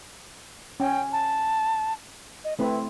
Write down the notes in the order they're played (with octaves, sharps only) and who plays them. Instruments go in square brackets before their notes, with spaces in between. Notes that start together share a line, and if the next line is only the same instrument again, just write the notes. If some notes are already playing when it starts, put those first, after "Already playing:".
[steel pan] C#4 [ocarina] G5
[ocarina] A5
D#5
[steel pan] A3 C4 E4 [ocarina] B4